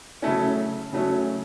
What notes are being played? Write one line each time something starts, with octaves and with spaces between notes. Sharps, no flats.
C#3 F#3 A3 C#4
C#3 F#3 A3 C#4